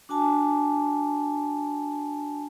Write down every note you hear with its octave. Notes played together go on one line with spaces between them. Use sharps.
D4 F#4 G#5 A5